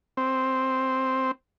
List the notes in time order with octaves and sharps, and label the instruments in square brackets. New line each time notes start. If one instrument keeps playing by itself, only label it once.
[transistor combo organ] C4